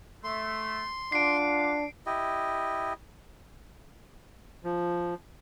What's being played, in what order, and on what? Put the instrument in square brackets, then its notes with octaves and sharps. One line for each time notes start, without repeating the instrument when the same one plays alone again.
[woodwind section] A3 [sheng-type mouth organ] C6
[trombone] D4 [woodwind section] F4 F#5 D6 [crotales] C7 D7
[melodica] E4 G4 D#5
[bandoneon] F3